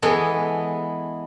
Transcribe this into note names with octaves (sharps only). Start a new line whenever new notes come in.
E3 G#3 B3 A4 D#5